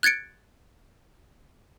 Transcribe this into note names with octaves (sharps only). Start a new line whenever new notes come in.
F#6 G#6 A6 C#7 D7